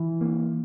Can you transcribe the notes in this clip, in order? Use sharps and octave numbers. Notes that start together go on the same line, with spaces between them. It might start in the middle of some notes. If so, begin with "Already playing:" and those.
Already playing: E3
A#3